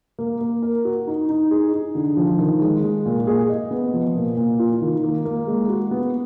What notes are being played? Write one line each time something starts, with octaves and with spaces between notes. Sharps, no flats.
A#3
A#3
A#4
F#4
D#4
D#4
G#4
D#4
D3
F3
D#3
G#3
G#3
A#2
G#4
D#5
B3
F3
A#2
A#2
F4
D#3
A#3
A#3
G#3
F#4
B3